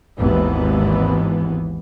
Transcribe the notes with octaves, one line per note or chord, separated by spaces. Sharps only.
G#1 D#2 E3 B3